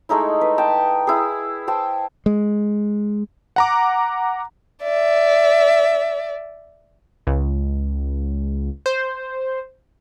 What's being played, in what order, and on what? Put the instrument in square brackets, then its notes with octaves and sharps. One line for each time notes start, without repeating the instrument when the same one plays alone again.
[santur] G#3 A3 D#4 E4
B4
G5 A5
E4 G#4
C5 G5 A5
[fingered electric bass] G#3
[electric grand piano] F#5 A#5 D6
[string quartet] D5 E5
[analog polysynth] C#2
C5